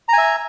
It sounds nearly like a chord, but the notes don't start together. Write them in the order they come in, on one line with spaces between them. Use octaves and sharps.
A#5 G#5 E5